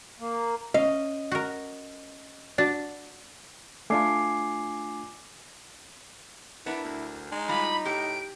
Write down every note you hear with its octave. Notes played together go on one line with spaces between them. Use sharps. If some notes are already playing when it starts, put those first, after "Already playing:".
A#3
C#4 D#5 F5
F#4 A#4
D4 F#4 D5
A3 D4 F4 G#5 D6 C7
B3 D4 E4 A#4
D2
G#3 D#4
A2 G3 F4 B5
A2 G4 D7